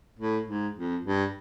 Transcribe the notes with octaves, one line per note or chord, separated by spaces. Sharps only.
A2
G#2
F2
G2